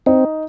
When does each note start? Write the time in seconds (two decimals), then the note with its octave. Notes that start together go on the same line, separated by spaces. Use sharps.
0.06 C4 D#4